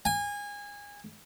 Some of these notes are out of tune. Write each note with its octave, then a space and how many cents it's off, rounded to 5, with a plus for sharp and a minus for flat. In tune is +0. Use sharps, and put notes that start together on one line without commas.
G#5 -25